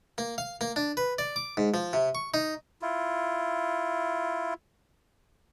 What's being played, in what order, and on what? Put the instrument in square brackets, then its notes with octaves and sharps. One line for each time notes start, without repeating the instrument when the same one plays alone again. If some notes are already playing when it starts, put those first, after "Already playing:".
[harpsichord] A#3
F5
A#3
D4
B4
D5
D6
G#2
F3
C3
C#6
D#4
[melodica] E4 F4